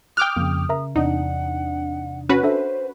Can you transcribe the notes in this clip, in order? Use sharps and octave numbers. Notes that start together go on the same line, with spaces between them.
G5 D6 D#6 F6 F#6
F2 C#3 A#3
C#3 A#4 E5 A#5
E2 C3 D4 D#4 F#5
C#4 F#4 B4
D4 A4 C5 E5